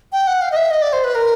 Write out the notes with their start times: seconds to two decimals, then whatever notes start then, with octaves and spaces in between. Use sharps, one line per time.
0.12 G5
0.27 F#5
0.41 F5
0.52 D#5
0.56 E5
0.71 D#5
0.82 D5
0.93 C5
1.04 B4
1.15 A#4